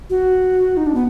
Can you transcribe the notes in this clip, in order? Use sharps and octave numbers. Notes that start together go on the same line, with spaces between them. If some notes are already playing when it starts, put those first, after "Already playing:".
F#4
D#4
D4
B3